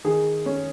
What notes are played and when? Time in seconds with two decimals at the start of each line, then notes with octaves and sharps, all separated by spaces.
0.04 D#3 G#4
0.46 C#4